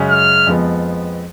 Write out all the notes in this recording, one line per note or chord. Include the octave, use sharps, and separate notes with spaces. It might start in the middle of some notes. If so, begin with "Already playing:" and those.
Already playing: F#2 C#3 G#3 C#4
F6
F2 F3 G#3 B3